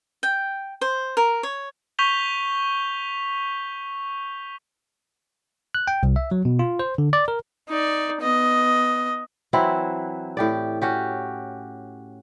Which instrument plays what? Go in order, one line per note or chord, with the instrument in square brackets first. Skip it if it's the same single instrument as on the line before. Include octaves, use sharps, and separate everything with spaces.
[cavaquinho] G5
C5
A#4
C#5
[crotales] C#6 G6 B6 F7 G7
[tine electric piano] F#6
G5
C2
E5
F#3
B2
F4
C5
D3
D5
A#4
[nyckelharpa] D#4 D5
B3 D#5
[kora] E3 F#3 C4 E4
A2 G4 D5
C#4 F#4 G4